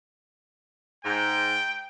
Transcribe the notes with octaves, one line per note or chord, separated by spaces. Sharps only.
G#2 G5